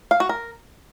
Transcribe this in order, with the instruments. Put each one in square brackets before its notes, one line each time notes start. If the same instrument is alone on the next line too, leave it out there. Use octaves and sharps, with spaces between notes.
[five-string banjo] F5
F#4
A#4